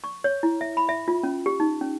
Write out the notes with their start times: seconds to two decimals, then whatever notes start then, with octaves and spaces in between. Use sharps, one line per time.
0.04 C#6
0.24 C#5
0.43 E4
0.61 E5
0.77 B5
0.89 E5
1.08 F4
1.23 C#4
1.46 G4
1.60 D#4
1.81 C#4